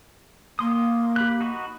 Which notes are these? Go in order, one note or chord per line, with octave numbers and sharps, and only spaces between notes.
A#3 C6 D#6
G4 B5 F#6
D#4 F#4 B5